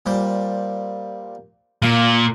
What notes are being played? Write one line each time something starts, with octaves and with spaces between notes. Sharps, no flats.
A#2 G3 C5
A#2 F5